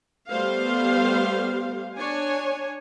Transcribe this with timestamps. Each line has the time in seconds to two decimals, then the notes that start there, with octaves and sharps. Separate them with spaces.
0.30 G3 A3 B3 C5 F5
1.97 D4 C#5 G#5